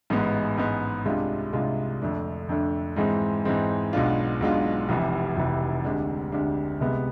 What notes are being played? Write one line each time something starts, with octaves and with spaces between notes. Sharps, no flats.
A1 G#2 G#3 B3
A1 G#2 G#3 B3
C2 C3 G#3 D4 F4
C2 C3 G#3 D4 F4
F2 D3 A3 D4
F2 D3 A3 D4
G#2 E3 G#3 C4
G#2 E3 G#3 C4
B1 B2 G#3 D4 F4
B1 B2 G#3 D4 F4
F1 F2 C3 E3
F1 F2 C3 E3
D2 C3 G#3 D4
D2 C3 G#3 D4
C2 C3 G#3 B3